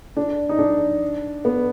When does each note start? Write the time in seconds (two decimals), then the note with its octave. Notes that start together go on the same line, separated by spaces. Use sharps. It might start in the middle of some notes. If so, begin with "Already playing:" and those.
0.17 D4
0.49 D#4
0.59 D4
1.45 B3